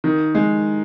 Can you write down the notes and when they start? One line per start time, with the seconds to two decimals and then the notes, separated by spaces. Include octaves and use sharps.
0.04 D#3
0.35 G#3